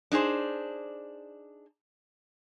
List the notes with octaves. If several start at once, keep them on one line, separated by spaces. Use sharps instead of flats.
D4 D#4 G#4 C5